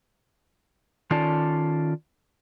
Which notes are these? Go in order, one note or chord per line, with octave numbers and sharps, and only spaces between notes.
D#3 C#4 F4 A4 D5 A5